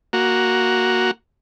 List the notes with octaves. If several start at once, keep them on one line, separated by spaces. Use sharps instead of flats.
A#3 F#4